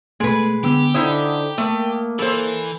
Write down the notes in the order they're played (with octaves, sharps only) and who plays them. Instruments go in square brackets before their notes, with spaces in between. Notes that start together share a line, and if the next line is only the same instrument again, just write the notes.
[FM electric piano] B2 A3 [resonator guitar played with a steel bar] G#3 B4
[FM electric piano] D3 B3 E6 [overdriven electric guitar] G4
[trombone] D3 [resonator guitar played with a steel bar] D#4 E4 C5 [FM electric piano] D#6
[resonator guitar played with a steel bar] A3 [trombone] A#3
[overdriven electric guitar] E3 [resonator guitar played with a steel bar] A4 C5